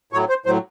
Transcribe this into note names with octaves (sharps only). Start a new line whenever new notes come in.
A2 F#3 C#5
C5
A2 F#3 C5